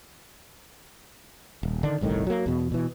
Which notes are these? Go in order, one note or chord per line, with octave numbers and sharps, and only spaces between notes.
D#1
D3 D#3 D4
G1 C2 A2 D#3
F#3 A#3
E2 B2
B2 E3